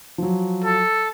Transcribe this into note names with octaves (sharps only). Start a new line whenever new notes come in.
F3 F#3
A4